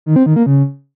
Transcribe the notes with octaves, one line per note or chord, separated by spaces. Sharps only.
D#3
C4
D#3
A#3
C#3